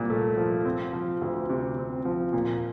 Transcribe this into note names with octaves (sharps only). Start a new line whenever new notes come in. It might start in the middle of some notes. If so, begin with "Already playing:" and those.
Already playing: C2 A#2
A3
F3
C4
F3
D2
C3
C4
F3
A#2